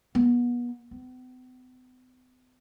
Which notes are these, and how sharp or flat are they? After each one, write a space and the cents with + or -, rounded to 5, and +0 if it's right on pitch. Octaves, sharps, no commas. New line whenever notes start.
B3 -30
B3 +45